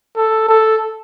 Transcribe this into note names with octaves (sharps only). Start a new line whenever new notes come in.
A4
A4